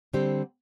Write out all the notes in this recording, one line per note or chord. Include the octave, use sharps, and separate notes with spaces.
D3 G3 C4 G4 C5